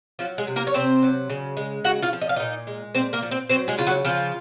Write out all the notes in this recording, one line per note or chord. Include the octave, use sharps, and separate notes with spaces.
F3 F#3 F4
G#3 G#4
C3
A#3 A#4
C#5
C3 C4 C5
F#3
C#3
G#3
C#3 F#4 F#5
F4 F5
F3
D#5
F5
A#2 D#4 D#5
G#3
A#2 C4 C5
A#3 A#4
F3
C4 C5
F#3 C4 C5
G#3 G#4
C#3 F4
F#3 F#4
C#3 F3 F4